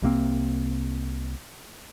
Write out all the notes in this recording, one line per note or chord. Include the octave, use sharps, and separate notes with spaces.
C2 C3 A#3 C4